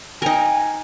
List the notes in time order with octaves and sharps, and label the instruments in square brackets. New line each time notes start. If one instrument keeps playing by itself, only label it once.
[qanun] D#4 A#4 [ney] G5 [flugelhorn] G#5